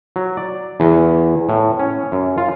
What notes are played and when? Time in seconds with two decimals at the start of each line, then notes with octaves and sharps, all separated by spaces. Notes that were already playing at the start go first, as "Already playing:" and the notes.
0.16 F#3
0.37 D5
0.80 E2
1.49 A2
1.79 C#4
2.12 F#2
2.38 F4